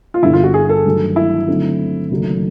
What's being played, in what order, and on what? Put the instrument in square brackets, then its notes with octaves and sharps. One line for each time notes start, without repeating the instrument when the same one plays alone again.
[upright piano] F4
[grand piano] G1 G2 D3 [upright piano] E4
[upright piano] F4
F#4
G#4
A4
[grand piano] G2 D#3 F#3 A3
[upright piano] E4
[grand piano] D3 F#3 A3 C4 D#4
F#1 F#2 D#3 F#3 A3